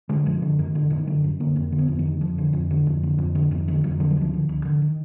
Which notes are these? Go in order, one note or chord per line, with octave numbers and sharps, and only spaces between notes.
D3 G#3
F#2 F3
D3
F#2 D#3
D3
F#2 D#3
D3 F#3
F#2
D3 A#3
F2 A#3
D3
B3
F2
D#3
D3
F2 F3
D3
F2
D3
F2
D3
F2
D3
F2 D#3
D3 D#3
F2 F#3
D3 F3
F#3
D2 F3
D3
D2
D3
D#3